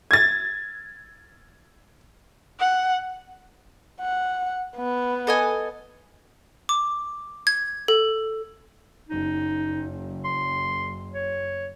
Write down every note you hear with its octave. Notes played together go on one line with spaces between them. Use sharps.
G#6 A6
F#5
F#5
B3
A4 D#5 G#5
D6
G#6
A4
F#1 D#4
C6
C#5